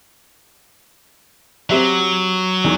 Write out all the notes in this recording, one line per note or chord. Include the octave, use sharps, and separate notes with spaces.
F#3 C4 G4 E5
E2 D#3